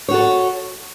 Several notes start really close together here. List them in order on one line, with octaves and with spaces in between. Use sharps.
C#5 F#4 A4